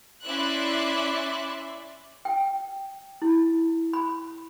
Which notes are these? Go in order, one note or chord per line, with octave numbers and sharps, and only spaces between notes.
C#4 E4 D5 E5 C6 F#6
G5
E4
B5